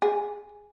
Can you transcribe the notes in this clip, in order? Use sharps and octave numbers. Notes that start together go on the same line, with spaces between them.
G#4